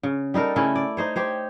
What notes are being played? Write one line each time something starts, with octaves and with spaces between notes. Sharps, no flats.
C#3
G3 D#4 A4 A#4
C#3 A3 C#4 E4
D5
D#4 C5 C#5
G4 C5 C#5